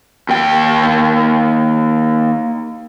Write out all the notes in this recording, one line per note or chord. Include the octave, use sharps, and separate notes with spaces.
D#2 G5